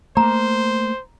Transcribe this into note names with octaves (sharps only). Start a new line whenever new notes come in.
A3 A#3 C5 A#5